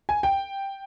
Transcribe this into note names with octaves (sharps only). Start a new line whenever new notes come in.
G#5
G5